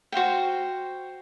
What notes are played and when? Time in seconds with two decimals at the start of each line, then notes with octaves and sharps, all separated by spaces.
0.12 F#4 C5 F5 G5